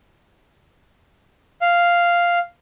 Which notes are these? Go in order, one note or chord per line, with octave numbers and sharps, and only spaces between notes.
F5